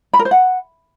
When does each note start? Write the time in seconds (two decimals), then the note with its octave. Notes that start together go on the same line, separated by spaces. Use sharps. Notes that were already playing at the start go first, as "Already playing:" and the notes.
0.13 B5
0.19 A#4
0.25 C5
0.31 F#5